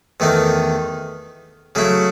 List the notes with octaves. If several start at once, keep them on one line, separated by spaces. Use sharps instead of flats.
E2 D#3 A3 D#4
C#3 F#3 A3 E4